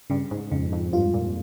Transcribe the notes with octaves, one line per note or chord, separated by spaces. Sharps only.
G2 C#3
G#2
F2 C#3
F2
G2 F4
A#2